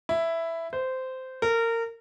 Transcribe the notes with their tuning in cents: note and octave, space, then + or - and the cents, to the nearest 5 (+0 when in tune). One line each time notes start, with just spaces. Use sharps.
E4 +5
C5 -15
A#4 -25